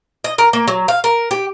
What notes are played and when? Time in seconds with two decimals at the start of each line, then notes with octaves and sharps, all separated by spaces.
0.24 D#5
0.38 A#4
0.53 A#3
0.68 F#3
0.88 F5
1.04 A#4
1.31 G4